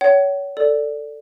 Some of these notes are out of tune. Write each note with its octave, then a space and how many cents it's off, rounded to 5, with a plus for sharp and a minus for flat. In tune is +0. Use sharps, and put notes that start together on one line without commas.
C#5 +25 F#5 +45
A4 +15 D5 +0